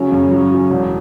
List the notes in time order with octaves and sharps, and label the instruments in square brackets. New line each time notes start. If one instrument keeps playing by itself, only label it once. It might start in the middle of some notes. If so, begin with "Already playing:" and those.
Already playing: [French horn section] C#3 C#4 [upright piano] F#3
[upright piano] F#2
F#3
F#3
E1